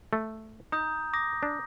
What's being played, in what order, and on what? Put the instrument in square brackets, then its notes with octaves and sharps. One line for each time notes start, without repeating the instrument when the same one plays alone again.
[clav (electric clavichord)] A3
[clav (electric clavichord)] D#4 [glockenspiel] A#5 D#6 G6
[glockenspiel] D6 D#6 A#6
[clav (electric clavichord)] D4